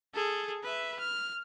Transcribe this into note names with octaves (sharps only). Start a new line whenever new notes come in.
G#4 A4
B4 E5
F6